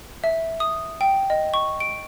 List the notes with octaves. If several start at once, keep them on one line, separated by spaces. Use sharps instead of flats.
E5
D#6
G5
D#5
C#6
D7